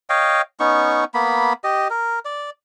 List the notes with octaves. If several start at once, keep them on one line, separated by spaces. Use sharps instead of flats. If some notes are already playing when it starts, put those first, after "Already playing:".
C#5 D#5 F5 G5
B3 C#4 D#4 C#6
A#3 B3 B5
G4 D#5
A#4
D5